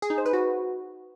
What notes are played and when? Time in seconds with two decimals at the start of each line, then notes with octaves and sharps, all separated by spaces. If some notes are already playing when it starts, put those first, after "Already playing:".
0.02 G#4
0.10 D#4
0.18 C5
0.26 B4
0.33 F#4